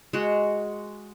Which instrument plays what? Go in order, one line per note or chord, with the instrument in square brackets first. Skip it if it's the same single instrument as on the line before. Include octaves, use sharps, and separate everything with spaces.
[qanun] G#3 F#4